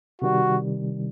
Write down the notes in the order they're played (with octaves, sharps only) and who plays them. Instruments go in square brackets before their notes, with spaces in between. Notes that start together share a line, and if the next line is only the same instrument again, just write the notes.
[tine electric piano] C3 D#3 G3 [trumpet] F#4